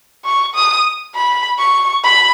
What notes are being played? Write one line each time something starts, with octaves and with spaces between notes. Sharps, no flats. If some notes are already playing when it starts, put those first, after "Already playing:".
C#6
D#6
B5
C#6
B5